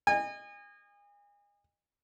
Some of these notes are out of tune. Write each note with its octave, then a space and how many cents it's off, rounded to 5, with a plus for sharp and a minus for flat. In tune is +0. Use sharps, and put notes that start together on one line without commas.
D#5 -30 G#5 -35